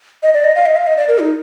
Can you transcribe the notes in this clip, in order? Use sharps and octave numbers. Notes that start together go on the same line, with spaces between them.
D#5
D5
D#5
F5
D#5
F5
D#5
D5
A#4
D#4